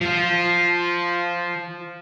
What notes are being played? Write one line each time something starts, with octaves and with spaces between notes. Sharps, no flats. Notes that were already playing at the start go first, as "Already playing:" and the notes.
F3 F4